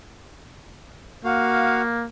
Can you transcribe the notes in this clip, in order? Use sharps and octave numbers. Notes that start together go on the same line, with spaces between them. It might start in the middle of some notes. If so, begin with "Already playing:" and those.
A#3 F#4 F5